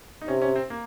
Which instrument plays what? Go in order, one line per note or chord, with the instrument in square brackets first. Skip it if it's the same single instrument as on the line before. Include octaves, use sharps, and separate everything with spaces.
[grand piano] D#4
[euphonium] C3 [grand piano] C#4
[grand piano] C#4
C4
A#3